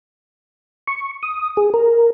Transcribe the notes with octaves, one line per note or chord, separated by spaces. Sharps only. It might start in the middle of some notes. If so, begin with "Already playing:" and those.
C#6
D#6
G#4
A#4